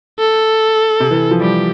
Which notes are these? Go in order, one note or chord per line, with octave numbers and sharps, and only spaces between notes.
A4
C3
E3
F3
G3 G4